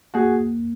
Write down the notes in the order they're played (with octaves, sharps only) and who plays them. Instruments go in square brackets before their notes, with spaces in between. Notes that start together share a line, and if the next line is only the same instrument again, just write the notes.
[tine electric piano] A#3 [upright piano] F#4 G#4